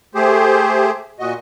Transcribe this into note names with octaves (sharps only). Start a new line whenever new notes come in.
A3 G4 G#4 C5
A#2 F#4 D#5